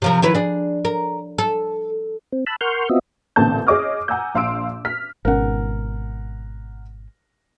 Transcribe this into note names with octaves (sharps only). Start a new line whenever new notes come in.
C3 F3 A#4
D#3 E4 B4
D4 G#4
A#4
A4
C4
A5 B5 E6 F#6
A#4 F#5 C6 C#6 F6 G6
B3 C4 F4 F#4 D#5 E5
A1 A#2 D3 C4 A5 G6
G#4 C#5 D#5 D6 D#6 F6
F#5 G#5 A#5 E6 G6
A#1 F5 C6 E6 D7
F6 B6
G#1 B2 C#4 A#4 F#5